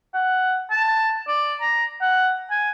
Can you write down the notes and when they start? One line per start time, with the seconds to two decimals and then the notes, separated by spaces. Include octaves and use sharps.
0.14 F#5
0.70 A5
1.28 D5
1.61 A#5
2.01 F#5
2.50 G#5